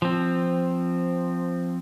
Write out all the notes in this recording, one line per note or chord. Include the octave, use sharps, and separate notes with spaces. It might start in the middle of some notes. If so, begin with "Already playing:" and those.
F3 C4